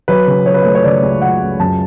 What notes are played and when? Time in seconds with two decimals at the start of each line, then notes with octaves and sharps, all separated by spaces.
0.08 F#3 B4
0.27 C#3
0.46 F#3 C#5
0.54 B4
0.63 A3 C#5
0.75 C#5
0.84 C#3 D5
1.03 C#2
1.22 F#3 F#5
1.41 C#2
1.59 F#2 A5